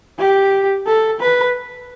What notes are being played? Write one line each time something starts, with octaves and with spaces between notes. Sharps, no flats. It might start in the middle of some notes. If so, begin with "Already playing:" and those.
G4
A4
B4